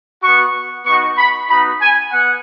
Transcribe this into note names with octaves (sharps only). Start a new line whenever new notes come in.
B3 F#4 C#6
B3 D#4 F#4 C#6
B5
B3 D#4 F#4 B5
G#5
B3 F#5